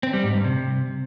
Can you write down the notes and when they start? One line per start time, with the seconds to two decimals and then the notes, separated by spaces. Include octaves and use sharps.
0.03 C4
0.13 G3
0.24 G#2
0.34 G2
0.44 C3